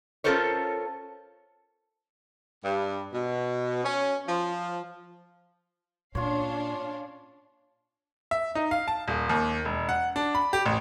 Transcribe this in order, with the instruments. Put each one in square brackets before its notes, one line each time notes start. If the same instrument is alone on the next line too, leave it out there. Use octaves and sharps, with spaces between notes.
[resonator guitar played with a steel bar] C#4 F4 A4 A#4 C5 C#5
[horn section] G2
B2
C#4
F3
[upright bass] A#2 [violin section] C#4 D4 F5 [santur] F4 C#5
[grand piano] E5
D#4
F5
A5
D#1
D#2
E1
F#5
D4
B5
G4
A1